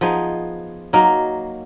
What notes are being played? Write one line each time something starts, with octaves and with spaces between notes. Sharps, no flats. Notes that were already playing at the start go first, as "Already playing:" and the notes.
F3 B3 D#4 G#4
F#3 A#3 D#4 A#4